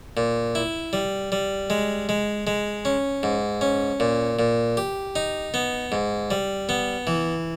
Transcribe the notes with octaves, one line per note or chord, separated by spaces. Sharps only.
A#2
E4
G3
G3
G#3
G#3
G#3
C#4
G#2
C#4
A#2
A#2
G4
D#4
B3
G#2
G3
B3
E3